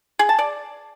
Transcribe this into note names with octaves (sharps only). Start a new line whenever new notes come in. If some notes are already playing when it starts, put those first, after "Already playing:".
G#4
A5
D5